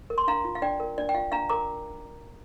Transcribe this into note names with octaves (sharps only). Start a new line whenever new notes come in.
A#4
C6
D4 F5 A#5
F4
F5
D4 D5 G5
A#4
D4 D5
G5
F4 F5
D4 F5 A#5
A#4 A#5 D6